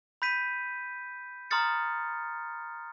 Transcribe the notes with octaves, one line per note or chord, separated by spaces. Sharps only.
B5 G6 B6 D#7
A#5 C6 D#6 F6 A6 C#7